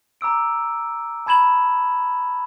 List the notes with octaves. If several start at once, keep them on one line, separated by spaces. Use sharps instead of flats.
A#5 D6 E6 D7
A5 B5 G#6 E7 F#7